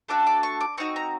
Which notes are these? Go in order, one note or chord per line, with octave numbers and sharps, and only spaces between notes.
A3 D4 F#4 A4 D6
D6
C#6
D6
C4 D#4 F#4 C#6
A#5